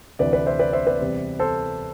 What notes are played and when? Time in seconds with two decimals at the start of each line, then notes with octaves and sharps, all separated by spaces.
0.19 D2 C3 E3 B4 D5
0.33 B4 D5
0.46 C5 E5
0.59 B4 D5
0.73 C5 E5
0.87 B4 D5
1.00 E2 C3 G3 C4
1.39 A4 C5